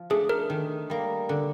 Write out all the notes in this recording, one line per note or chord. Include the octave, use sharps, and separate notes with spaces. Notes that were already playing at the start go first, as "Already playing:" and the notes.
Already playing: F3
A3 D4 G#4
A#4
D#3
G3 A#3
D3